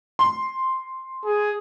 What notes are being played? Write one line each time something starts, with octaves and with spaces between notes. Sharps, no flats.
C6
G#4